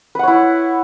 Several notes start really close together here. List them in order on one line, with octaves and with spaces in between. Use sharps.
B4 F#5 C#5 E4